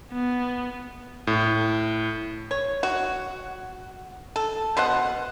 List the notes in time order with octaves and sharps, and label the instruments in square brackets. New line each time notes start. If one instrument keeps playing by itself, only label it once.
[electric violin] B3
[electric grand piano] A2
[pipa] C#5
F#4
A4
B2 C5 D#5 F#5